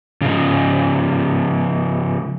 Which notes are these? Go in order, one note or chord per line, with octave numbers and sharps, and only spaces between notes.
C#3 F3